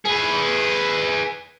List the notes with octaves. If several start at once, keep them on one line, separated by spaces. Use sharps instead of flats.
G#4 B4